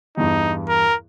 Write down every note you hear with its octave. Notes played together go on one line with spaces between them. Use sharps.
E2 G2 D#4
A#4